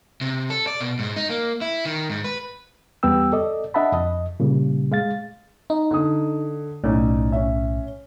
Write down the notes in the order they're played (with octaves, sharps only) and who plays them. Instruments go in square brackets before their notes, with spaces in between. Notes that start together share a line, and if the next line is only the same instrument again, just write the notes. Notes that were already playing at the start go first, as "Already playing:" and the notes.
[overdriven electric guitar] C3
A4
D5
B2
G#2
D#4
A#3
E4
D#3
G#2
B4
[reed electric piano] E2 G3 B3 G5 E6
A4 D5 D#5
D4 D#5 E5 F#5 A5 B5
F2 D#5
A#2 C#3 G3
G#3 F5 A6
[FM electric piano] D#4
[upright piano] D3 D#6
[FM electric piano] B1 A2 [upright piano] C#4 D#4 D5
[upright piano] C#4 E5